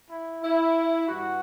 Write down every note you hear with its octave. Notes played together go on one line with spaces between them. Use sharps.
E4
E4
G2 E3 G3 F#4